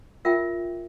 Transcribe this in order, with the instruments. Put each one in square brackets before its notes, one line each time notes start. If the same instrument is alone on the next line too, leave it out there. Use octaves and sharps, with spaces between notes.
[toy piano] F4 A#4 E5 G5